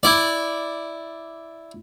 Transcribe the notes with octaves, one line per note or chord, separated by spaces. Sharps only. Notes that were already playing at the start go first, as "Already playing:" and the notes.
E4 D5